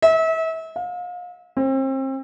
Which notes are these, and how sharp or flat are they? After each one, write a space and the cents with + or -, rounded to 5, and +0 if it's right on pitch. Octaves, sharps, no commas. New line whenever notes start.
E5 -35
F5 +35
C4 +35